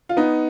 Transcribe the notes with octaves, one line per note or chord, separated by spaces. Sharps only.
F4
B3 D#4